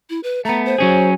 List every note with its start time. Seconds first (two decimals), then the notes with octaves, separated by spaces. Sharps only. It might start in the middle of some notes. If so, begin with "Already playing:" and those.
0.10 E4
0.23 B4
0.45 A3 B3 A#5
0.65 C5
0.78 F#3 C#4 G#4